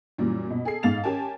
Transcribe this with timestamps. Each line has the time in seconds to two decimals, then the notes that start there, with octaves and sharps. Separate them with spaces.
0.18 F#2 A#2 E3 G3
0.50 B2
0.65 G#4 A4 G#5 C7
0.83 G#2 F5 A6 F7
1.04 C#4 G4 A#4 G#5 A5